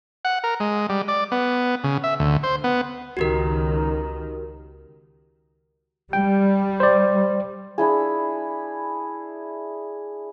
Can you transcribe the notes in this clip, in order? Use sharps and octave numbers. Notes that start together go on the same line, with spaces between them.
F#5
A#4
G#3
G3
D5
B3
C#3
E5
D2
C5
B3
C#2 D#3 F#4 G4 A#4
G3 G5
C5 D5
D4 E4 G#4